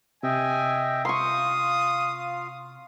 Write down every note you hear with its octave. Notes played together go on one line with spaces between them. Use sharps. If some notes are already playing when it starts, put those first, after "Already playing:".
C3 D#5 E5 G5 G#5
F4 F5 C6 C#6 D#6